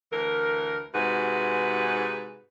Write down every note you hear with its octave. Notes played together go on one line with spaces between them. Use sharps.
D2 E3 A#4
G#2 C3 F#4 G#4 B4